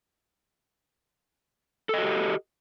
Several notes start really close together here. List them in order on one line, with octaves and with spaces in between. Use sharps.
A4 D#5 F#4 G4